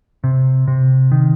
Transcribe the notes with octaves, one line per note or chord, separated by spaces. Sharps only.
C3
C3
D#3